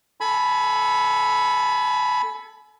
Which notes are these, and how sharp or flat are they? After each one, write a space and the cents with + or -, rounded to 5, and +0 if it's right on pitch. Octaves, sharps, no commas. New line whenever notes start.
A4 +0 G#5 +35 B5 +0